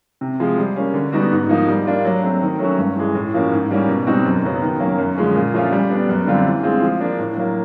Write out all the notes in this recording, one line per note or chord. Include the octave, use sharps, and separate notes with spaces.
C3
F3 G#3
G3
A#3 C#4
D3
G3 B3 D#4 F#4
G#2
F3 A#3 D#4
G3
A#3 D4 F4
F#3
A3 C4
D#3
F#3 A3 C#4 F#4
G2
E3 G#3
A2
F3 A#3 C#4 F#4
G#2
E3 G3 A#3 C#4
B2
G3 C4 D#4 F#4
F#2
C#3 F#3 B3
D#3
F#3 A#3 C#4
F#2
D3 F3 G#3 C#4
A#2
F3 A3 C#4 F4
G3
B3 D4
F#2
D3 G3 C4 F4
E3
G#3 C4 F4
F3
A#3 D4
A2
F#3 A#3